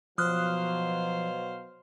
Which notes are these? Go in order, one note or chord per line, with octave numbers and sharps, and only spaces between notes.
B2 F3 F#3 C5 F5 D#6 F6 F#6